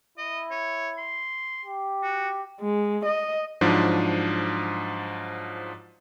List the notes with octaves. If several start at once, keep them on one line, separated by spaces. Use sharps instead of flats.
E4 D#5
C#5
C6
G4
F#4
G#3
D#5
G#2 F3 F#3 D4